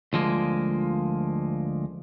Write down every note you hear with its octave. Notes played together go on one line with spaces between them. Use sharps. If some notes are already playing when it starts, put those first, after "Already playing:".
D2 F3 G#3 A#3